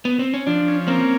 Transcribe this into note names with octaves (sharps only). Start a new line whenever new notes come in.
B3
C4
C#4
F3 D4
C#4
A#3 C4